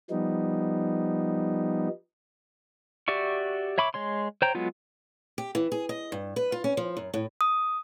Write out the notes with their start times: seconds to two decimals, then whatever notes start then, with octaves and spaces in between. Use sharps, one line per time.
0.10 F3 G3 B3 D#4
3.08 F#4 G4 D5 E5 C#6
3.78 C#5 E5 B5 C#6 D6
3.94 G#3 C#5 C6
4.42 C5 C#5 G5 A#5 G6
4.55 F#3 G#3 B3 F4
5.38 G4
5.55 E3
5.72 G#4
5.89 D#5
6.12 G2
6.36 B4
6.52 F4
6.64 C#4
6.77 F3
6.97 F#2
7.14 A2
7.41 D#6